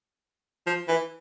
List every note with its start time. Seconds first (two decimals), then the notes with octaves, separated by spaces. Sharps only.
0.67 F3
0.89 E3